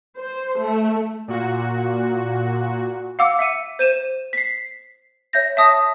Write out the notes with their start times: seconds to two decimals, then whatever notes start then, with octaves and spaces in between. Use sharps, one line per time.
0.16 C5
0.59 A3
1.28 A#2 F#4
3.19 F5 F#5 D6 E6
3.39 E5 C#7 D#7
3.79 C5 D#7 E7
4.33 B6 C7
5.33 C#5 E5 G6 A#6
5.57 E5 A5 D#6 A#6